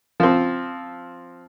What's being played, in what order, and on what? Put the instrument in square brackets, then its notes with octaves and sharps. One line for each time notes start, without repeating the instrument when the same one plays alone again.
[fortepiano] F3 C4